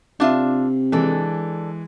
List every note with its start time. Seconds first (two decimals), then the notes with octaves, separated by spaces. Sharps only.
0.20 C3 D4 F4 E5
0.92 E3 G#3 D4 A4